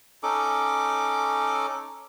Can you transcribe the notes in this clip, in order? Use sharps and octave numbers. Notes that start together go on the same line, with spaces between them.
C#4 D#4 A4 D6